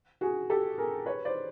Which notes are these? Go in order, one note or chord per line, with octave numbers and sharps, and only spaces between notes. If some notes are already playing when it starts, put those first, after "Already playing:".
F#4 G#4
G4 A4
G#4 A#4
B4 C#5
C5 D5